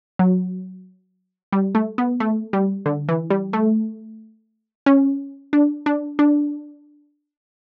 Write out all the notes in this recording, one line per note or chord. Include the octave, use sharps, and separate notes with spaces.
F#3
G3
A3
B3
A3
G3
D3
E3
G3
A3
C#4
D4
D4
D4